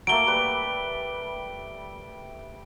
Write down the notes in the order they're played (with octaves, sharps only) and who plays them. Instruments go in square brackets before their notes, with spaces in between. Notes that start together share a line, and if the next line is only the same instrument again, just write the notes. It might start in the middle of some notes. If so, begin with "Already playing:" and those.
[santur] F#3 A3 A#3 [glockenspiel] D7 G7
[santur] G3 B4 D6